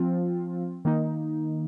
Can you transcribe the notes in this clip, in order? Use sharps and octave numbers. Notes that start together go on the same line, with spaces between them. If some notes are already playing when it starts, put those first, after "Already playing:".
Already playing: F3 C4 F4
D#3 A#3 D#4